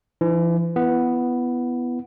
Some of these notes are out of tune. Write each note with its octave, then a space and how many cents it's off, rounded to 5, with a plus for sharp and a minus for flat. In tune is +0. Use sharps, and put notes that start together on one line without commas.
E3 +40 D#4 +0
B3 +0 E4 +25